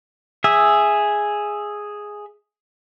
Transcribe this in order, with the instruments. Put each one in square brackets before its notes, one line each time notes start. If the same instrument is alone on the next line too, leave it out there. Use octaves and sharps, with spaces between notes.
[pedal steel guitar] G#4 E5